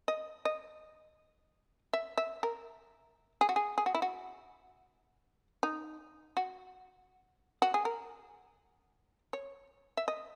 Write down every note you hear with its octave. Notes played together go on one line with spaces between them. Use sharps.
D#5
D#5
E5
E5
A#4
G#4
F#4
G#4
G#4
F#4
E4
F#4
D#4
F#4
F#4
G#4
A#4
C#5
E5
D#5